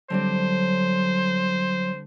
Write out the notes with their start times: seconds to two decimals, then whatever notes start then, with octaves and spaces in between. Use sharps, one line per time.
0.10 D3 F#3 G3 C4 C5